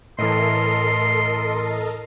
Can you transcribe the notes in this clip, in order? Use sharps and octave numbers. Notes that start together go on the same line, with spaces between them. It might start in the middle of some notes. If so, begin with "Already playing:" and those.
A2 E3 A4 A#4 D#5 C6